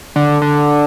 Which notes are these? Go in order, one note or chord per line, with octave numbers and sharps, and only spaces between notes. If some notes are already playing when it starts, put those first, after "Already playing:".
D3
D3